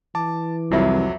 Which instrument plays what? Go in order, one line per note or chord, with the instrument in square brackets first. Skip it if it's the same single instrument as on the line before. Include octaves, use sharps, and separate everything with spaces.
[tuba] E3 [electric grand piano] A5 D6
[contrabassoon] C2 [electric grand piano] F2 F#3 [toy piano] F4 B4 E5